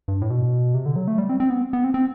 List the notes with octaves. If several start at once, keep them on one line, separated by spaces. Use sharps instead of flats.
G2
A2
B2
C3
D3
F#3
A3
G3
C4
C4
B3
B3
C4
C4